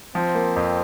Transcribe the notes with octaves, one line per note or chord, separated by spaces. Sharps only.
F3 C4
A#3
F2